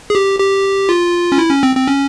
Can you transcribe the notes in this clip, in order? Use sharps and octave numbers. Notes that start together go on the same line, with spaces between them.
G#4
G4
G4
F4
C#4
E4
C#4
C4
C4
C#4